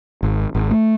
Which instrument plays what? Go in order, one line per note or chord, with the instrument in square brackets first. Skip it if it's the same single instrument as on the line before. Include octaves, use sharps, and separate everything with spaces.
[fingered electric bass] G#1
G#1
A3